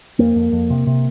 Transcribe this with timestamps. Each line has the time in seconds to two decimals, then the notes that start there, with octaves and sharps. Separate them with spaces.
0.19 F2 A#3
0.36 F2
0.53 F2
0.70 C3
0.87 C3